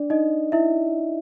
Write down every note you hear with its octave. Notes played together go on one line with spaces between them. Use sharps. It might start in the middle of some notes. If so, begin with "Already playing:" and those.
Already playing: D4 D5
D#4 D#5
E4 E5